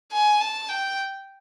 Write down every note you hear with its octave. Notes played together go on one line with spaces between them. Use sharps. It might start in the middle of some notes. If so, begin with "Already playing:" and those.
G#5
A5
G5